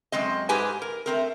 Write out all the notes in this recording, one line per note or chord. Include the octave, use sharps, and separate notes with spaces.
F#2 G#3 C4 D#5
G#2 G4 G#4 B4 G#5
A#4
A3 C4 A#4